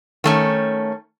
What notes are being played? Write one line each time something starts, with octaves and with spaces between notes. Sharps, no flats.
D#3 A3 C#4